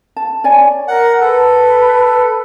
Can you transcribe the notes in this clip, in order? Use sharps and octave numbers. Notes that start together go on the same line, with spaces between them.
A5
C#5 D5 G#5
A#4 F#5
A4 B4